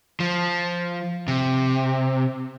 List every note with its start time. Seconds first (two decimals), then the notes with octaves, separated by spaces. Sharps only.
0.20 F3
1.28 C3